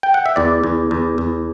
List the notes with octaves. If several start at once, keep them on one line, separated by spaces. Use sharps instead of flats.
G5
F#5
E5
E2 D5
E2
E2
E2